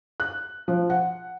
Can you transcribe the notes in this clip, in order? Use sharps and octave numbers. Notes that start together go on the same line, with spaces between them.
F#6
F3
F#5